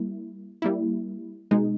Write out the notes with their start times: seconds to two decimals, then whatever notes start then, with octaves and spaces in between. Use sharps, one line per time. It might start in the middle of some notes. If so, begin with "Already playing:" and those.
Already playing: G3 A#3 E4
0.62 G3 A#3 E4
1.51 B2 G#3 D#4